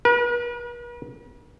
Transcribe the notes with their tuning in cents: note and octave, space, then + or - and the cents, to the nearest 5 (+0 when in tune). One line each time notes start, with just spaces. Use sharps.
B4 -45